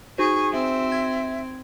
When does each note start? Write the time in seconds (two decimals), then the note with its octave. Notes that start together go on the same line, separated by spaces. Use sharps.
0.18 D#4 F#4 G#4 C5 C#6
0.52 C4 E5
0.92 G#6